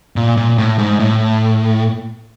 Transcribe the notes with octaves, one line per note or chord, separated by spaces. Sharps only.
A#2
A#2
A2
G#2
A2